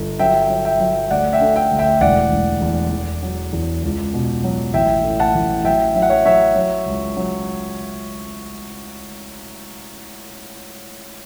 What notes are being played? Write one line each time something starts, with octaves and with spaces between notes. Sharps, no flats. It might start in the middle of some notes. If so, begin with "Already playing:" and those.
Already playing: G1
F#3 E5 G5
F#3
E5 G5
F#3
D2 D5 F#5
E5 G5
D3
E5 G5
D2
E5 G5
E1 D5 F#5
E1
E2
E2
F#3
E2
C#2
B2
F#3
A1 E5 G5
A2
F#5 A5
A1
F#3 E5 G5
F#3 E5
F#5
C#5 E5
F#3 C#5 E5
F#3
C#2
F#3